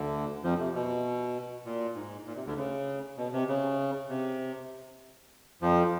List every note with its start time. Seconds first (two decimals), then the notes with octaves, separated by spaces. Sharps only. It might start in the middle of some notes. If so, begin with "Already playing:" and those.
Already playing: D2 D3
0.44 F2 F3
0.59 C3
0.74 B2
1.65 A#2
1.96 G#2
2.26 A#2
2.36 C3
2.46 D2 D3
2.57 C#3
3.17 B2
3.33 C3
3.48 C#3
4.09 C3
5.62 F2 F3